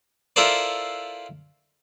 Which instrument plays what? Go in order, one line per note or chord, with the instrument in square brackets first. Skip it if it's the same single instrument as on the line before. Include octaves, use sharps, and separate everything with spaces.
[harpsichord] E4 F4 A4 A#4 C5 D5